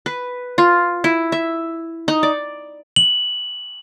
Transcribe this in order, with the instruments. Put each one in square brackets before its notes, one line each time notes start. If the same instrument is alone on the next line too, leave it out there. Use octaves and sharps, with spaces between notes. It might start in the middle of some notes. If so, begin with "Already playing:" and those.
[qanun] B4
F4
E4
E5
D#4
D5
[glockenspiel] F#7